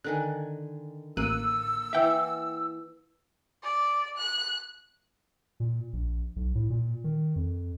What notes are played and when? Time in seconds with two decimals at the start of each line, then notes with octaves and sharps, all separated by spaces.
0.04 D3 D#3 G#5 F#6
1.17 A1 A#3 E6 F#6 D#7
1.93 E3 E5 F#5 G5 D6
3.63 D5
4.17 F#6
5.60 A#2
5.93 A#1
6.36 B1
6.55 A2
6.70 A#2
7.04 D#3
7.36 F2